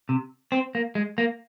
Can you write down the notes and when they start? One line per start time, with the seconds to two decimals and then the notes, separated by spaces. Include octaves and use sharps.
0.09 C3
0.52 C4
0.75 A#3
0.95 G#3
1.18 A#3